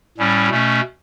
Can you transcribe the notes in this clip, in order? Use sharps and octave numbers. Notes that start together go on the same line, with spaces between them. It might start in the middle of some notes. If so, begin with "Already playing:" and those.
A2 G3 C#4
B2 A3 C#4